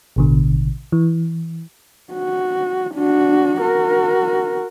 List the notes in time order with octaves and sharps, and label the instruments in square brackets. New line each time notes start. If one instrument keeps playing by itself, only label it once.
[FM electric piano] A1 B2 D3
E3
[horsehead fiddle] F#4
D4 F#4
F#4 A#4